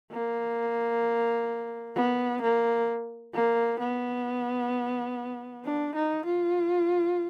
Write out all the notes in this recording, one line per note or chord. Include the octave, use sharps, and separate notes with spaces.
A#3
B3
A#3
A#3
B3
D4
D#4
F4